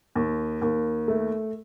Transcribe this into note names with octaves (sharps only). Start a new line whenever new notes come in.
D#2
D#2
A3